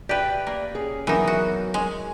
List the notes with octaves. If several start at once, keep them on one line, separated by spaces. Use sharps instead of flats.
G4 B4 D5 E5 G5
A#3
C#4 G#4
E3 F#3 B3 D#4 A#4
F#4
G#3